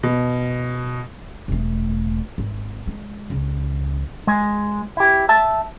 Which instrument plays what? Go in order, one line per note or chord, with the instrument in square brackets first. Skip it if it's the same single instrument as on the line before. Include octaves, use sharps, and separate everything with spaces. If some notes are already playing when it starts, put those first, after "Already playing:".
[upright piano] B2
[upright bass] E1 A3
G#1
G#3
C#2 C#3
[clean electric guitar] G#3
E4 G4
E5 A5